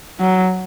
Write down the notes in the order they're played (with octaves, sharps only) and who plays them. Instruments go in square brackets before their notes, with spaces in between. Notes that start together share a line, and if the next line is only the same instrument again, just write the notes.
[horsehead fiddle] F#3